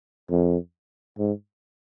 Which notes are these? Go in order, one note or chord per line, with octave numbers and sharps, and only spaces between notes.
F2
G#2